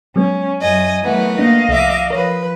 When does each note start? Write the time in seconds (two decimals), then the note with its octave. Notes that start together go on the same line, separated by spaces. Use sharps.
0.16 F#3 G#3 B3 C#4
0.62 F#2 D#5 G#5
1.04 E3 F#3 A3 B3 A#4
1.39 A#3 D4 D#5 F5
1.69 C2 F3 E5 D6
2.10 F3 A#4 B4 C#5